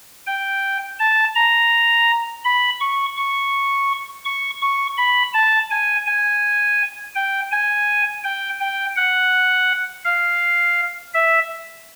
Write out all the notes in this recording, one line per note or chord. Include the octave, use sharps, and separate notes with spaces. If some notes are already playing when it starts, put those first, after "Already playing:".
G5
A5
A#5
B5
C#6
C#6
C#6
C#6
B5
A5
G#5
G#5
G5
G#5
G5
G5
F#5
F5
E5